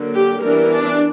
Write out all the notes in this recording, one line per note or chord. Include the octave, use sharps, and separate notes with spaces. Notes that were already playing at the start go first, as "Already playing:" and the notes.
Already playing: D3 F#3 A#3
G4
E3 G3 B3 D4 A#4
D4